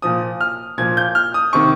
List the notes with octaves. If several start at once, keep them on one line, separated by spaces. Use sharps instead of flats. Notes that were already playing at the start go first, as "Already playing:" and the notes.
A#2 F3 D#6
F6
A#2 F3 G#6
G6
F6
D#6
C3 D#3 C#6